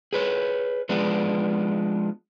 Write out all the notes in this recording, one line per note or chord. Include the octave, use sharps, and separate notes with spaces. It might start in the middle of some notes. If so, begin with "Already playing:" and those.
G#4 B4 C#5
F3 G#3 B3 D4